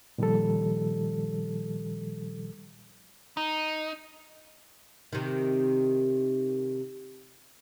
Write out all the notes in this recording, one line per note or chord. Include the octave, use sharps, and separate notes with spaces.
A#2 D#3 F3 G3 A4
D#4
C3 D#3